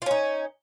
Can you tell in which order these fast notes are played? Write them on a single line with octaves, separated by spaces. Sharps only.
F4 C#4 D#4